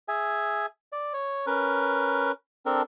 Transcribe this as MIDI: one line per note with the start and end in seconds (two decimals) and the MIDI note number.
0.08 0.66 68
0.08 0.66 76
0.08 0.66 80
0.92 1.13 74
1.13 1.46 73
1.47 2.32 61
1.47 2.32 70
1.47 2.32 71
2.66 2.82 60
2.66 2.82 62
2.66 2.82 69
2.66 2.82 70